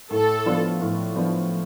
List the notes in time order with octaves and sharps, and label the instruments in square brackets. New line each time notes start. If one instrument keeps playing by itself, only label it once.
[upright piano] A2 [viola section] A4
[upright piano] F3 B3 D4 F4
A2
F3 B3 D4 F4